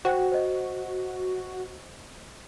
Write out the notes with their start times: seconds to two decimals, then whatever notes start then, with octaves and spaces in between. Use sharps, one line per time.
0.05 F#4 C5 F#5 G5
0.32 C5 D#5